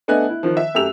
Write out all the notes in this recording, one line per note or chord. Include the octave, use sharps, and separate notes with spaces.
A3 B3 D4 D#5 G#5 F#6
E4
D#3 F3
E5
F#2 A3 G4 E6 F7